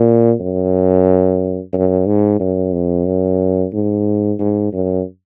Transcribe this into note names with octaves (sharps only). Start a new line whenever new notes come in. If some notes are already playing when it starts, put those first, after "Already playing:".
Already playing: A#2
F#2
F#2
G#2
F#2
F2
F#2
G#2
G#2
F#2